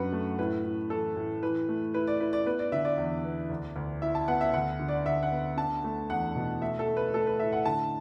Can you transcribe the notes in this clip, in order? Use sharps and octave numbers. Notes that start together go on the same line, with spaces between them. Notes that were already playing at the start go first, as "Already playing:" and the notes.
Already playing: F#2 F#3 D4 B4 F#5
A3
A2 B4
A2
E3 A4
A2
E3 B4
A3
E4 B4
D5
E4 B4
D5
B3 B4
D5
D3 E5
D5
E2
B3
D2
D2
E4 E5
A5
B3 F#5
E5
D2 F#5
D3
D5
D2 E5
F#5
B3
D4 A5
A3
E2 F#5
B2
A3 E5
A4
A3
B4
A3 A4
B4
A2 E5
F#5
D3 A5